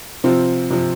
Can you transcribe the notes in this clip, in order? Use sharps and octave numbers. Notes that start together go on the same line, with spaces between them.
C3 F3 C4 F4
C3 F3